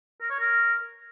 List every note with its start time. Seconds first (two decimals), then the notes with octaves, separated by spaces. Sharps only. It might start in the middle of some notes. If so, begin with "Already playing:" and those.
0.21 A#4
0.30 C#5
0.39 A#4